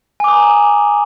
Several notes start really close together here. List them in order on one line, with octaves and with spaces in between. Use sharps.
G#5 D6 D#6 A#5